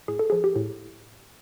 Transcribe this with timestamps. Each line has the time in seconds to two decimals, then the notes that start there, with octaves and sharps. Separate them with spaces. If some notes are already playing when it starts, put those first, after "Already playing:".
0.08 A2 G#4
0.19 A4
0.30 F3 G#4
0.44 G4
0.56 A2